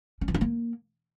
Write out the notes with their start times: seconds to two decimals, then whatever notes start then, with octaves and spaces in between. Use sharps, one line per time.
0.21 C#4
0.28 E3
0.34 D4
0.41 A#3